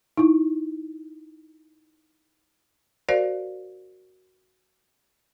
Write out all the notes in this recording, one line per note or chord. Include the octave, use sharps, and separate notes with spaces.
D#4 E4
F#4 A#4 C5 D5 F5